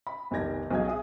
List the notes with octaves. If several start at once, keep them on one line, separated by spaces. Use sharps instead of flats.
B5
F1 B1 D#3 G4 G#6 A#6
B1 F#3 G#4 D#5 F5 G#6
G#4 E5 D#6